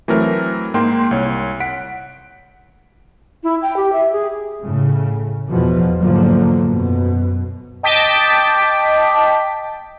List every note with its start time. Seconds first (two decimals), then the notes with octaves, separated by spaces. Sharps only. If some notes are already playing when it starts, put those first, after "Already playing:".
0.08 E3 F#3 A3 C4 A#4
0.74 G#2 A#3 G5 C6
1.11 C2 C#5
1.60 F#5 B6 D7
3.44 E4
3.62 G5
3.76 G4
3.93 E5
4.12 G#4
4.63 A2 C#3
5.48 E2 B2 F3
5.99 E2 G#2 D3 F3 F#3 A#3
6.66 F#2 B2
7.83 D#5 G5 A5 D6 B6